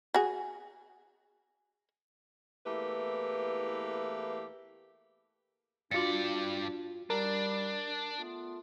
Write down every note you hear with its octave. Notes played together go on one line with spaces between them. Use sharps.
F#4 G#4
E2 A3 A#3 E4 G4 B4
G2 D4 F4 F#4 D5 A6 C#7
G3 D4 A#4
A3 B3 F4